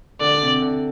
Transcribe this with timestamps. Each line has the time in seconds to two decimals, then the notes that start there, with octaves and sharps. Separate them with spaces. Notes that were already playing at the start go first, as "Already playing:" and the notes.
0.20 D3 D5
0.42 C3
0.53 C3
0.62 D3